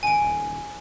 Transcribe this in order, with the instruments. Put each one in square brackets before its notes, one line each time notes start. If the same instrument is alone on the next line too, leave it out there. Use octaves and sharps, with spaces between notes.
[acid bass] G#1 [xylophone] G#5 D7
[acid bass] D#1